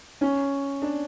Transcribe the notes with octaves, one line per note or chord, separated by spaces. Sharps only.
C#4
D4